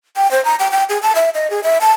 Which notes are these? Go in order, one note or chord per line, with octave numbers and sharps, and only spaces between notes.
G5
C5
A#5
G5
G5
G#4
A5
E5
D#5
G#4
E5
A5